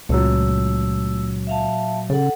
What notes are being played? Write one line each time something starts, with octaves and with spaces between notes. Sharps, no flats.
C#2 A#2 F#3 A3 E6
E5 F5 A5
C#3 A4 F#5